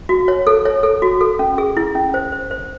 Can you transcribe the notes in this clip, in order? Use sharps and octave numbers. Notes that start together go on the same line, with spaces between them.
F#4
C#5
A4
C#5
A4
F#4
A4
C#4
G#4
E4
C#4
C5
C5
C5